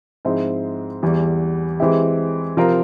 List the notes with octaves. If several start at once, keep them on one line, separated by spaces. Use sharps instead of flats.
G#2 F3 G#3 C4 E4
E2 E3 G3
E3 G#3 C4 E4 G4
C3 F3 C4 F4 A#4